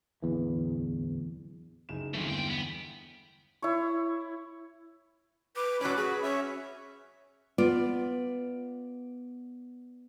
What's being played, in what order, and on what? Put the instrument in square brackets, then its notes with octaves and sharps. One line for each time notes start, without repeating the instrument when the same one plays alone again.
[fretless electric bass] D1 E2 E3
[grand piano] F#1 D#4 E7
[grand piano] G1 E2 [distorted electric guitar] A3 C4
[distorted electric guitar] G#3 G5
B3
[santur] E4 C#5
[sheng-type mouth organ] B4 [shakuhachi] D6
[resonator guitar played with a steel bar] A2 F#3 [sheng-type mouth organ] C#4 D6 [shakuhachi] B4
[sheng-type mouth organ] F#4 [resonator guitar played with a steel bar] G#4 [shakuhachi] B4
[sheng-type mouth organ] C#4 E5 [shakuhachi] C#5
[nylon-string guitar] B3 F4 D5